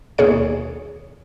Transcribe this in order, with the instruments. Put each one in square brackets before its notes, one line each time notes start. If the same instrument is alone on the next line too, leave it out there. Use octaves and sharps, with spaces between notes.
[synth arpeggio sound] D#2 B2 G#4 C#5 C#7